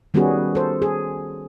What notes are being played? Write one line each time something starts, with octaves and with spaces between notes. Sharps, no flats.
D#3 G3 B3 C#4 F#4 G#4
A4 C5
G#4